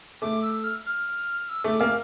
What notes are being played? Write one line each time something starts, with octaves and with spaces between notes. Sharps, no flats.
A3 D6
E6
F6
F6
E6
A3 D6
A#3 F6